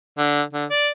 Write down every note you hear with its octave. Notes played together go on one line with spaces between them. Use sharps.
D3
D3
D5